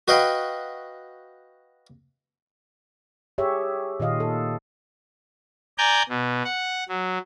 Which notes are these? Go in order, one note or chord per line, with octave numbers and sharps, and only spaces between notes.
F#4 B4 D#5 F5 G5 B5
G4 G#4 C#5 E5
A#2 D#3 F4 D#5 F5
A4
D5 G#5 A#5 G6
B2
F#5
F#3